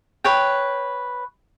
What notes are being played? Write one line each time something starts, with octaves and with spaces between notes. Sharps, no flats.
B4 C#5 G5